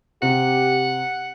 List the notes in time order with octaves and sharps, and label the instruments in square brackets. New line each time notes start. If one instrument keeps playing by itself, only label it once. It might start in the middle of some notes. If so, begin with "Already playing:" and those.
[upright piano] C3 [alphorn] G4 [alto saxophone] F#5